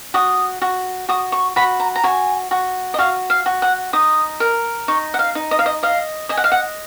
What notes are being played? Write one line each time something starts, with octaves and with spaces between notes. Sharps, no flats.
F#4 D#6
F#4
F#4 D#6
C#6
F#4 B5
A#5
A#5
F#4 G#5
F#4
D#5
F#4 F5
F5
F#4
F#5
D#4 D#6
A#4
D#4 C#6
F#5
F5
D#4
D#5
F5
D#5
D#5 F5
D#5 G#5
F#5
F5
F#5